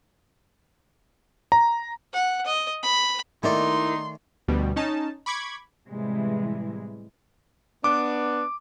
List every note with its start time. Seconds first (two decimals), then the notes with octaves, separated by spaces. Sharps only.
1.52 A#5
2.13 F#5
2.46 D#5
2.83 B5
3.43 D#3 A3 A#3 D#4 E4 D5 C6
4.48 D2 B2 G3
4.76 C#4 D#4 A5
5.26 B5 C#6 D6 G#6
5.89 A2 C3 E3 G3 G#3 E4
7.84 B3 D4 D6